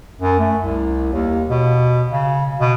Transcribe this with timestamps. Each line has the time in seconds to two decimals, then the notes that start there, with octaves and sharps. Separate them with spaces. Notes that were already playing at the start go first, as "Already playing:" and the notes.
0.21 F#2
0.39 A3
0.62 C2
1.13 D#2
1.49 B2
2.11 C#3
2.60 B2